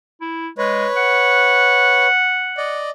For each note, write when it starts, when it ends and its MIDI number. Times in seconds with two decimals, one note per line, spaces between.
0.21 0.48 64
0.58 0.86 56
0.58 2.07 71
0.58 2.07 73
0.96 2.80 78
2.57 2.90 74
2.57 2.90 75